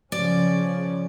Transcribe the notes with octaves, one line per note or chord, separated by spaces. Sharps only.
C#3 F3 C#4 D5